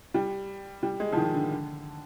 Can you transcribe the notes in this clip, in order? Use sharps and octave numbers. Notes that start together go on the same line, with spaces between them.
G3
G3
G#3
F3
D#3
D3
D3